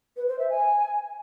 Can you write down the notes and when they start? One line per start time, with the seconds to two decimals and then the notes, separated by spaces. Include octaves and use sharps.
0.17 B4
0.28 C5
0.39 E5
0.50 G#5